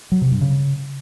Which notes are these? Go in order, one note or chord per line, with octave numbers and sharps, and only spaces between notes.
F#3
C3
G2
C#3